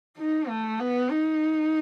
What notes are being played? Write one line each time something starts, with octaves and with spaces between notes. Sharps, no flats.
D#4
A3
B3
D#4